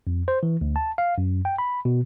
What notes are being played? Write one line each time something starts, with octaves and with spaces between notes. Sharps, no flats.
F2
C5
E3
D2
A5
F5
F#2
G5
B5
B2